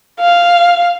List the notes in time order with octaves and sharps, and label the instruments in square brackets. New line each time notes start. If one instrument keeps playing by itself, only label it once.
[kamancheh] F5